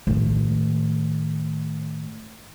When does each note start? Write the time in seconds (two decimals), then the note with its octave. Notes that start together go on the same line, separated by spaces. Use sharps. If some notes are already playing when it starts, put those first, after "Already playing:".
0.07 A2 D#3